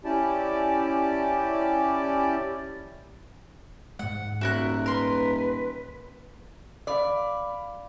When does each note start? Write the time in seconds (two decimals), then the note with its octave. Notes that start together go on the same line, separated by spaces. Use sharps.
0.05 C#4 E4 G4 D5 A5
3.99 G#2 G#3 F#5
4.41 D#1 F#4 A#4 E5 F#6
4.86 A#4 B4 C6
6.87 D5 F5 B5 D6